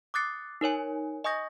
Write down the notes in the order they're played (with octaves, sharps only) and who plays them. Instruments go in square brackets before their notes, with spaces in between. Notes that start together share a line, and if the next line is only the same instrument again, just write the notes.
[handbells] D6 D#6 F#6 A6 C7 C#7
D#4 A#4 C#5 G#5
D#5 G#5 C#6 D#6 G6 A#6